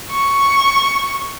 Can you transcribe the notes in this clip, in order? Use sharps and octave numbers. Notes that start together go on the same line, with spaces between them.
C#6